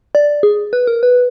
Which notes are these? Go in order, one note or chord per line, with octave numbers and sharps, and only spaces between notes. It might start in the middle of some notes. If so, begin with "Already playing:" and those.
D5
G#4
B4
A#4
B4